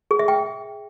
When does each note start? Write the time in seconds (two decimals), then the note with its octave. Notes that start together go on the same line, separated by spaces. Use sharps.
0.11 G#4
0.19 E5
0.28 G5